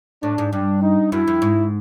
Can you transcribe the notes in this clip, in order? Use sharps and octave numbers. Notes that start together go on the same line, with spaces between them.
A2 D4
G#2
G2 D4
D#4
F#2 E4
F2
G#2